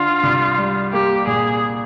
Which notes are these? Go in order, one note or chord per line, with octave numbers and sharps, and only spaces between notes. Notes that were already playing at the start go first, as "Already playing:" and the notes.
Already playing: D3 D4 F4
C2
G3
A#3 G4
A#2 G#4